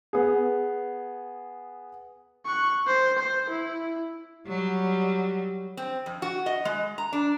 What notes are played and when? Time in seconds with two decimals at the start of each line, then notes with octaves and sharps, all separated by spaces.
0.13 B3 G#4
2.46 C#6 F#6
2.87 C5
3.18 C5
3.49 E4
4.47 F#3 G3
5.77 C4
6.06 F2
6.22 F#4
6.46 D#5
6.65 G#3
6.98 A#5
7.13 D4